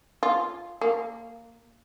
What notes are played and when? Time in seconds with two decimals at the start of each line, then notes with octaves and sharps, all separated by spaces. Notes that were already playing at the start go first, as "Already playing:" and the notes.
0.23 F4
0.81 A#3